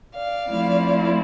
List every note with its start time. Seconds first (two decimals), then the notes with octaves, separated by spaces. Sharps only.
0.16 D5 F5
0.50 F3 A3 C4 E4